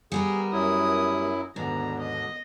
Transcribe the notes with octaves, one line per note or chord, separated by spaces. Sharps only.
G3 B3 G#4 A#4
F#2 F#3 E4 D#6
D#2 G#2 B2 D3 B3 D4 A#5
D#5